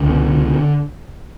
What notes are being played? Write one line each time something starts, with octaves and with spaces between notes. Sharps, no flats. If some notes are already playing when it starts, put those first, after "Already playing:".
Already playing: C#2 D3
B2
C#2